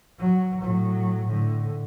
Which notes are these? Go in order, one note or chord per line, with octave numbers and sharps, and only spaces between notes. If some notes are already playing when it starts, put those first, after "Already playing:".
F#3
A2 F#3
A2 D3